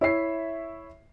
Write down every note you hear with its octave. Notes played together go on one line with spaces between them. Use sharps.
E4 C#5 E5 C7